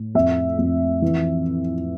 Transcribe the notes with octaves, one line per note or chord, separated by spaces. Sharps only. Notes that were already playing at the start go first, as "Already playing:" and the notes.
Already playing: A2
F2 E5
F2
E3